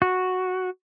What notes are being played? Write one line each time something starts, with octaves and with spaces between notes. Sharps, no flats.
F#4